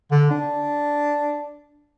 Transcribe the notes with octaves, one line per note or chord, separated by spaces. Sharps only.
D3
D4